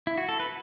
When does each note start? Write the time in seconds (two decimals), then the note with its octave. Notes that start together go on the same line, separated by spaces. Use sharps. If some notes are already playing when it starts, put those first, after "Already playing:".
0.07 E4
0.18 F#4
0.29 A4
0.40 B4